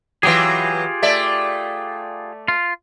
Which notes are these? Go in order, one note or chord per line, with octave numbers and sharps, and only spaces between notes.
E3 F#3 F4 G4 G#4
A3 D5 E5
F4